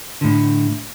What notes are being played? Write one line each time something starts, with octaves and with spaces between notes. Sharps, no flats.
A2 D3